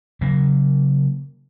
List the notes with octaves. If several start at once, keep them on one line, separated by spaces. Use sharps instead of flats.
C#3 F#3 A#3